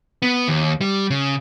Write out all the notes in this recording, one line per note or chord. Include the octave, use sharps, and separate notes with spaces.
B3
D#2
G3
C#3